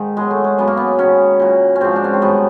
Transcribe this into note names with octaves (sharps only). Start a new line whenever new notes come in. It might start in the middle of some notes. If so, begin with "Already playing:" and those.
Already playing: G#2 D#3
B2 F#3 G#3
A3
G#3
F#2 C#3 F#3 B3
A#3
B3
G#2 D#3 F#3 C#4
A#2 F#3
C#4
G#2 F3 C4
D4
C#4
C4
G2 D#3 F#3 B3